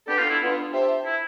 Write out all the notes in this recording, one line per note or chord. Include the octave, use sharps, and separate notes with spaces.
B3 D4 G4 A4
F4
E4
B3 D4 F4
G4 C5 E5 A5
E4